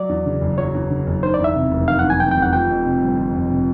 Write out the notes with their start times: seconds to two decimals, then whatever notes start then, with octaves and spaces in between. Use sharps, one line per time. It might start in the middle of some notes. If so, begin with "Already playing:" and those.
Already playing: F#3 D5
0.09 E2
0.26 C#3
0.41 F#1
0.58 F#3 C#5
0.74 E2
0.90 C#3
1.07 F#1
1.23 D#3 C5
1.34 D5
1.39 E2
1.44 E5
1.56 C3
1.71 F1
1.88 D#3 F5
1.99 F#5
2.04 E2
2.10 G#5
2.20 C3 G5
2.31 G5
2.37 F1
2.42 F#5
2.53 F3 G5
2.69 F2
2.86 C3
3.02 G1
3.18 F3
3.34 F2
3.51 C3